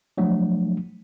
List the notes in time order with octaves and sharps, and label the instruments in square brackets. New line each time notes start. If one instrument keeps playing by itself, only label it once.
[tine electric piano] F3 F#3 A3 D4